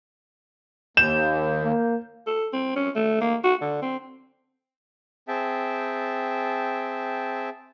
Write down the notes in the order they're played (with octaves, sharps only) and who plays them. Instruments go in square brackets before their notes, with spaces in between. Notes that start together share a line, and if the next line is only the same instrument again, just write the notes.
[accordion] D#2 [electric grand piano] G6 [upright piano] E7
[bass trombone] A#3
[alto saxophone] A4
C4
C#4
A3
A#3
F#4
D3
C4
[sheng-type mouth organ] C4 G#4 E5 G5 A5